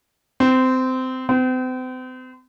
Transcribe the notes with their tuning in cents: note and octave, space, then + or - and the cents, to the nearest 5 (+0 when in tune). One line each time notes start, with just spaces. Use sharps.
C4 -20
C4 -40